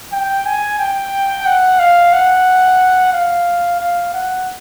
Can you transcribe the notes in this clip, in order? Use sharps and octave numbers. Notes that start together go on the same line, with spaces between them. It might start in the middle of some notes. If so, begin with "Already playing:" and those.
G5
G#5
G5
F#5
F5
F#5
F5
F5
F#5